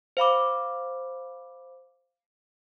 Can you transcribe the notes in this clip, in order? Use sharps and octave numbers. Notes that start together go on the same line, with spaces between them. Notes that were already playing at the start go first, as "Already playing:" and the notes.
C5 F5 B5 D6